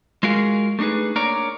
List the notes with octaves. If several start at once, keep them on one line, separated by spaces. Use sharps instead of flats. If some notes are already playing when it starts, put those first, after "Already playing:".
G#3 F4 F#4 G#4 A#4 F5
A3 D4 D#4 G#4 B4
A#3 D4 A#4 C#5 D5 A#5